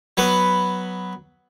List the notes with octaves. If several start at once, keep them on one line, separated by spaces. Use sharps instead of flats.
F#3 B3 B4